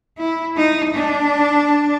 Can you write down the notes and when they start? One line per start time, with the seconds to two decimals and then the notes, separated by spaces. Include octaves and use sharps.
0.18 E4
0.56 D#4
0.94 D4